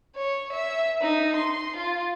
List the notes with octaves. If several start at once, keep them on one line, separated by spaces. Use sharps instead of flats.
C#5
E5
D#4
C6
F4